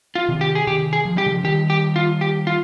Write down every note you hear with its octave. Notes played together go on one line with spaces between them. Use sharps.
F4
C3 D#3
G4
G#4
C3 D#3 G4
G#4
F3
G3 G4
C#3 F3
D#3 G3 G4
G4
F4
G4
F4